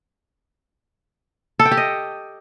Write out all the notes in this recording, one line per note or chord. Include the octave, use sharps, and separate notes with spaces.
A4
G5
G4
D#5